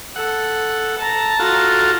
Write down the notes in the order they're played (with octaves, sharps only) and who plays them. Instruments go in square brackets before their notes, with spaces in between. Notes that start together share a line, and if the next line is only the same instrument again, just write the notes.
[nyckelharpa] A4 [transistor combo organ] F#5
[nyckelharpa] A5 A#5
[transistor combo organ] F4 F#4 A4